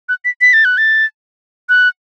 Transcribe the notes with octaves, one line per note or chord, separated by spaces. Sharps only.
F#6
B6
B6
A6
F#6
A6
F#6